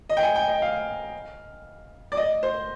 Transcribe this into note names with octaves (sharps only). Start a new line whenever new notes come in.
D#5
G5
G#5
G5
D#5
F5
D5
D#5
C5